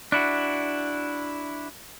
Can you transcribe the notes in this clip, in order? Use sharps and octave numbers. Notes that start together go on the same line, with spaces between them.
D4 E4 F#4